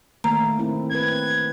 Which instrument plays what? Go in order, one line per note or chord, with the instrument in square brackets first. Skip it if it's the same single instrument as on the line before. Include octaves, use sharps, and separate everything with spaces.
[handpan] D#3 A3 A#3 [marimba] A#5
[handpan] A#3 C4 E4
[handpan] C4 B4 [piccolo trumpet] G#6